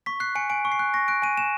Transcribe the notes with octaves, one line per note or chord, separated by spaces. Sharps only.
C#6 B6
F#6 C7
G#5 C#7
G#5 D7
C#6
C7
F#6
C#6 A#6
F#6 D7
G#5 D#7
G#5 E7